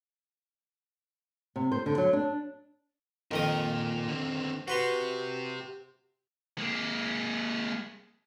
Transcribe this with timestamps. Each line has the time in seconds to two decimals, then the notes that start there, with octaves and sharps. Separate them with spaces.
1.56 C3
1.72 C5
1.86 D3
1.98 F#3
2.13 D4
3.31 F2 A#2 D#3 A#4 D#6
4.08 D3 C4
4.68 F#4 G4 B4 C5 C6
6.58 G#3 A#3